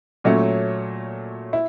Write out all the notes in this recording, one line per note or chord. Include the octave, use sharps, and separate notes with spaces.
A#2 F#3 A3 C#4
E4